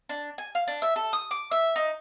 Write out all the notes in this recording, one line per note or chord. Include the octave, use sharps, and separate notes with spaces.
D4
G#5
F5
D4
E5
A4
D#6
D6
E5
D#4